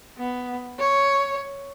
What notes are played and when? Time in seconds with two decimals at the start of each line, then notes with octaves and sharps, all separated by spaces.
0.18 B3
0.79 C#5